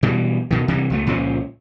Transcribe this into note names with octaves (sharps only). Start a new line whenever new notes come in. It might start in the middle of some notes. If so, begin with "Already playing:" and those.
B2 E3 G3
B2 D#3
C3 E3 G3
C#2 F#3 A3
C#2 A#2 F3 C#4